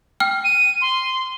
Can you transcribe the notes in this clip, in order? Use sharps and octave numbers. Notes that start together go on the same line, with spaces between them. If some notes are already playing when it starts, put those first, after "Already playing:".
G5 F6
D#7
C6